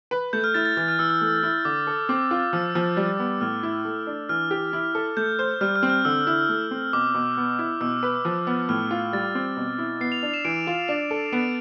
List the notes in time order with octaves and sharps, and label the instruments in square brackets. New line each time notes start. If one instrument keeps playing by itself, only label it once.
[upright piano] B4
[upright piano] A3 [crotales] G6
[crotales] F6
[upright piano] E4 [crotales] A6
[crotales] A6
[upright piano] E3 [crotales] A6
[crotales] F6
[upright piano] E3 [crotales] E6
[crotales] E6
[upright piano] A3
E4
[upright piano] D3 [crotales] D6
[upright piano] A4
[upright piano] C4 [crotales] D6
[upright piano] F4
[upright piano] F3 [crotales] E6
[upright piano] F3
G3
B3
[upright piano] A2 [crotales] F6
[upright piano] E4
A3
D4
[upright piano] E3 [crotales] F6
[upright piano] G4
E4
A4
[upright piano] A3 [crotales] G6
[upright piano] C5
[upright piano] G3 [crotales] F6
[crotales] F6
[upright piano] C4
[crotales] F6
[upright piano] D3 [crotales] E6
[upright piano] E4
A3
C4
[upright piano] B2 [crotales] D6
[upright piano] B2
B3
E4
[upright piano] B2 [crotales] E6
[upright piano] B4
F3
B3
[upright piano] A2 [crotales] F6
[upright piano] F4
[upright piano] G3 [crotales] A6
[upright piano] C4
B2
E4
[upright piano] B3 [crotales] C7
[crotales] F7
[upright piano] D4 [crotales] F7
[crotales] E7
[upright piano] E3 [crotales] D7
[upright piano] F4
[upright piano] D4 [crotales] E7
[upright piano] A4
[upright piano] B3 [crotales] D7